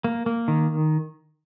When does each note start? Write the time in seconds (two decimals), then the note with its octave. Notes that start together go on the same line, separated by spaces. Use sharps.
0.04 A#3
0.26 A#3
0.48 D#3